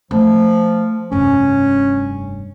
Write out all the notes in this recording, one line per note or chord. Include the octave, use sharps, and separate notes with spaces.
F3 A3
F1 G2 C#4